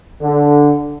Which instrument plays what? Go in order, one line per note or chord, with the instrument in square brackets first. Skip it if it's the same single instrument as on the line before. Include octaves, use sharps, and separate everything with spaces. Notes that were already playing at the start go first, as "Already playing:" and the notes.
[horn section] D3